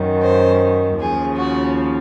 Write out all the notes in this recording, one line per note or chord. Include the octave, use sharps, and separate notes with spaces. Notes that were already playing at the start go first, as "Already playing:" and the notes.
Already playing: F#2 D#3
C5
D#2 C#3 F3 G#4
F#4